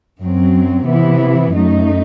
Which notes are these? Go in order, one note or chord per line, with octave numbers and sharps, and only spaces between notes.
F#2 F#3 C4
C3 E3 B3 E4
F#2 F#3 A3 D#4